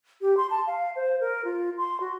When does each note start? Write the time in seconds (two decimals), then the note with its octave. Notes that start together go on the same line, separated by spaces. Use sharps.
0.21 G4
0.37 C6
0.51 A5
0.67 F5
0.96 C5
1.21 A#4
1.45 F4
1.78 C6
2.00 F#4